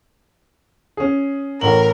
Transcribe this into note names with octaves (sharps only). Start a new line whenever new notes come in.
C#4 G#4
A1 A2 A#4 F#7